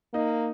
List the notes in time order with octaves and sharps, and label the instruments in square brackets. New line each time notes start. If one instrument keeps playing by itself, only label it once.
[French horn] A#3 [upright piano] D#4